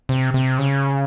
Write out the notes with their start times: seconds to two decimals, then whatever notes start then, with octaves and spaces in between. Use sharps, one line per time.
0.09 C3
0.34 C3
0.59 C#3